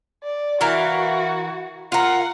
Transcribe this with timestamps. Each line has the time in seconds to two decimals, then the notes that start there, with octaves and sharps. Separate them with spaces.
0.23 D5
0.61 E3 F#4 A#4 F5
1.92 F4 A#4 F#5